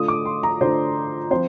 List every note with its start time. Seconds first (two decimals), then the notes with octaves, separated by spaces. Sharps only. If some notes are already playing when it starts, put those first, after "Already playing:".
Already playing: D3 A3 D4 F4 D#6
0.08 D6
0.25 C6
0.43 A#5
0.61 D3 A3 D4 F4 C5
1.30 F3 C4 C5